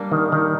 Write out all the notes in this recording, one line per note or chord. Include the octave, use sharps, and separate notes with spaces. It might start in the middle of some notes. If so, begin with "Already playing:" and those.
Already playing: G3 A#3 D4
D#3
D#3